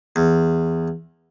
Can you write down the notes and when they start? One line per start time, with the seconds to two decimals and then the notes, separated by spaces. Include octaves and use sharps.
0.16 E2